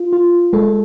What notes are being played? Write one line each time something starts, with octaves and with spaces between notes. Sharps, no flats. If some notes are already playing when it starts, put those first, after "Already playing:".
Already playing: F4
F4
G#3 A4